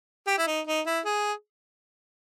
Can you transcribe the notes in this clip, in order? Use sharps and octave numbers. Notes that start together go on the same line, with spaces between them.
G4
E4
D#4
D#4
E4
G#4